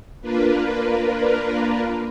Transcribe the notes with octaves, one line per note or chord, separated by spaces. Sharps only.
A#3 D4 F4 A#4 B4